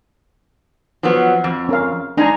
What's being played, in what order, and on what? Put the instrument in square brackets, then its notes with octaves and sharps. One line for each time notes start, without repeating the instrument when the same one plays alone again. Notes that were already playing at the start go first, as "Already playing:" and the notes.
[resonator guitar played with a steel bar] F3 F#3 B3
F2
[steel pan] C#4 A#4 F5
[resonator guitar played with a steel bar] G#3 D#4 G#4 [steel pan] D4 G#5 A#5